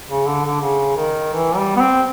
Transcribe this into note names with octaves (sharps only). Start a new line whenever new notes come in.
C#3
D3
D3
C#3
D#3
E3
G3
B3
C4